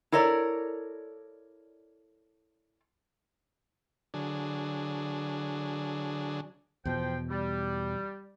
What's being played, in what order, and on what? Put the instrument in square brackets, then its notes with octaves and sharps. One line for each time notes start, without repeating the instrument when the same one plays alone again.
[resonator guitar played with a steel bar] E4 A4 A#4 C#5 D5
[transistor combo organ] D3 F#3 D4 G#4
[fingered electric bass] E2 B2 [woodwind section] F3 C5 G5
[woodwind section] G3